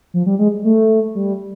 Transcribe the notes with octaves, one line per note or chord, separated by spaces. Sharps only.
F3
G3
G#3
A3
G3